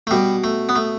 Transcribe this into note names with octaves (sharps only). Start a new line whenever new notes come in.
A3
B2 G3
A3
B3
A3